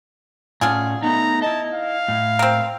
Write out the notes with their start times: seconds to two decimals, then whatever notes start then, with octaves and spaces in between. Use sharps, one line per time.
0.61 A2 D3 C#4 F4 G#4
1.02 A3 B3 D#4 A#5
1.42 E4 D#5 A5
1.74 F5
2.08 A2
2.39 A#3 C4